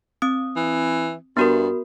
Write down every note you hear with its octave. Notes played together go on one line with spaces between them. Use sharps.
C4 D#6
E3
G2 B3 F#4 A#4